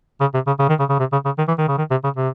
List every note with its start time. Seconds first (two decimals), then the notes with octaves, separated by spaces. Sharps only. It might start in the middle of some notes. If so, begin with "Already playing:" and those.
0.21 C#3
0.34 C3
0.47 C#3
0.59 C#3
0.69 D#3
0.80 C#3
0.90 C#3
0.99 C3
1.12 C#3
1.25 C#3
1.38 D#3
1.48 E3
1.58 D#3
1.68 C#3
1.78 D#3
1.91 C3
2.04 C#3
2.17 C3